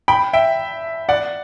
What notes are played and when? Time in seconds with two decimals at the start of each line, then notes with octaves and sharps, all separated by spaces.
0.08 G5 B5
0.33 E5 G5
1.09 D5 F#5